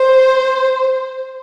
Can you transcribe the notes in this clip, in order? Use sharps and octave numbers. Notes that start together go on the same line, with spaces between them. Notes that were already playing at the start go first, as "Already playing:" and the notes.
Already playing: C5